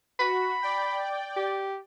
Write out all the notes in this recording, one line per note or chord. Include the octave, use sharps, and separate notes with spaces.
F#4 B5
D5 G5
G4